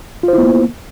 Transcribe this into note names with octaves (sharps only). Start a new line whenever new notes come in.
A#3 B3 E4 F4 C5